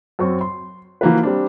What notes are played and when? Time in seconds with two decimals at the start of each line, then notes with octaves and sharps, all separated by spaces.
0.19 F#2 C4 C#6
0.41 C6
1.01 E3 F3 A#3 F#4 B4
1.23 G3 C4 D4